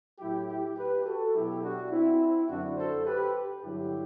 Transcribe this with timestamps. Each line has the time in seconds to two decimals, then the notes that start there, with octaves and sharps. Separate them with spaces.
0.19 A2 F#3 E4 G4
0.48 E4 G4
0.76 G4 B4
1.05 F#4 A4
1.34 B2 F#3 E4 G4
1.63 D4 F#4
1.91 C4 E4
2.49 F#2 D3 F#3 D4 F#4
2.77 A4 C5
3.06 G4 B4
3.63 G2 D3 F#3 E4 G4